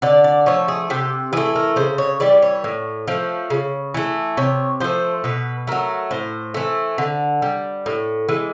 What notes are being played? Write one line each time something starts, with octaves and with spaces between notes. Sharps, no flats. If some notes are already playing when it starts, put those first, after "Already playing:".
D3 D5
D5
F3 A3 C#5
G#4
C3 G4
E3 A3 G#4
A#4
C#3 C5
C#5
E3 G3 D5
C#5
A2
F3 A3
C#3
E3 A3
C3 C#5
F3 A3 C5
B2 B4
F#3 A3 A#4
A2 C5
E3 A3
D3
G3
A2
E3 G#3